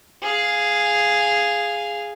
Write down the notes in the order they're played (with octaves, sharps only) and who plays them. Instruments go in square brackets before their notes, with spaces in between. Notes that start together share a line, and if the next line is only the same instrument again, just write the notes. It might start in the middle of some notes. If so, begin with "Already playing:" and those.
[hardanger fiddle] G#4 F5